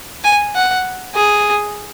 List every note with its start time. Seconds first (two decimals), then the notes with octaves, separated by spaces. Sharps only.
0.24 G#5
0.55 F#5
1.15 G#4